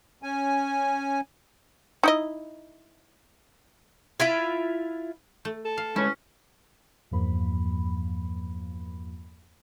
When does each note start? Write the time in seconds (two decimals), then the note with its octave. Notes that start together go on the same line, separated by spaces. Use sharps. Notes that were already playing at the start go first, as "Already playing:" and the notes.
0.23 C#4 G#5
2.03 D#4 E4 D#5
4.20 E4 F4 E5
5.45 A3
5.65 A4
5.78 F5
5.96 G#3 C#4 E4 B4 C#5
7.11 E2 G2 F3 A#3 B5